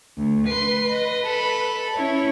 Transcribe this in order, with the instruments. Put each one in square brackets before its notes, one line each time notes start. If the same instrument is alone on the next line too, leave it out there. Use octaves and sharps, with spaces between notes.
[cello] D2
[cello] B4 [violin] C6 C7
[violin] D#5
A4 B5
[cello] C#4 E4 [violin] C#5